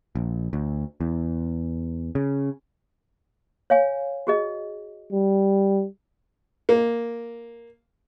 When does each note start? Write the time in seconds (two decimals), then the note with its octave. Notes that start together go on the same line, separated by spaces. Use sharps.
0.15 A#1
0.53 D2
1.01 E2
2.15 C#3
3.70 C#5 F5 G#5
4.27 F#4 G#4 D#5
5.12 G3
6.69 A#3